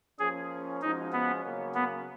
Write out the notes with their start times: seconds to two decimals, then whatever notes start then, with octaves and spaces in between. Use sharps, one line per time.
0.19 F3 A#3 C#4 G#4
0.81 F3 G#3 C#4 D#4 F#4
1.13 B3
1.43 C#3 F#3 A#3 C#4
1.75 B3